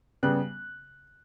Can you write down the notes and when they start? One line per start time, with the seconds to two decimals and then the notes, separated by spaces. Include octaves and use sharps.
0.23 C#3 G3 B3 F#6